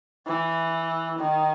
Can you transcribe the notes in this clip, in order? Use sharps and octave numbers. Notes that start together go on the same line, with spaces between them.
E3
D#3